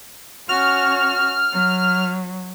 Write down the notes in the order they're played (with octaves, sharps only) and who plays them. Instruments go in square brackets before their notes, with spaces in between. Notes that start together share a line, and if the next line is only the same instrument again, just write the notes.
[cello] C#4 F#4 [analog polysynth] F6
[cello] F#3